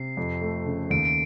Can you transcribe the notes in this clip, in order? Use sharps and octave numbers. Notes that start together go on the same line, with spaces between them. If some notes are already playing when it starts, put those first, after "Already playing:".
Already playing: C3 C7
F2
A3
C#3
D#2 D7
D7